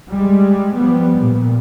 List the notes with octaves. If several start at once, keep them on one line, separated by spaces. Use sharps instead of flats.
G3 G#3
F3 G3 B3
A#2